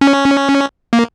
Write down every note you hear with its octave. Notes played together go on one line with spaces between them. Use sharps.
C#4
A#3